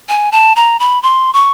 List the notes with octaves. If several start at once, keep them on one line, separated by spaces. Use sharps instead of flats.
G#5
A5
A#5
B5
C6
C#6